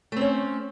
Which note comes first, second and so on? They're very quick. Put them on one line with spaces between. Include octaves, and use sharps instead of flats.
A3 C4 C#4